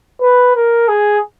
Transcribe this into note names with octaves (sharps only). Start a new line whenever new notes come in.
B4
A#4
G#4